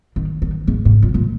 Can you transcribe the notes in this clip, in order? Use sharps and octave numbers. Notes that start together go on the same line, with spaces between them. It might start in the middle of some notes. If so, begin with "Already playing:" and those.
D#3
D#3
G#2
G#2
A#2
A#2